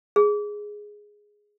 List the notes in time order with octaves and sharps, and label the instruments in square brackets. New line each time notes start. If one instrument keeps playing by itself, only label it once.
[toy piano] G#4